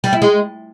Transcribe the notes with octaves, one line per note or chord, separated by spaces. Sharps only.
G3
E4
G#3